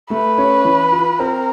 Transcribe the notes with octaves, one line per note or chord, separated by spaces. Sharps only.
A3 B4
C#4
E3
F4
C4 A#4